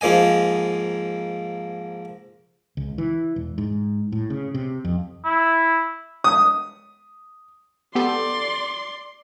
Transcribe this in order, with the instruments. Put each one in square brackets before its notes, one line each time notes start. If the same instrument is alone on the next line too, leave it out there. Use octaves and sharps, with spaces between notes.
[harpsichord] G#2 F3 A#3 D#5 G#5
[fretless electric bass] C#2
E3
E1
G#2
A2
C#3
C3
F2
[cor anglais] E4
[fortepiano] D#6
[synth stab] B3 G4 A4 [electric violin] D5 C6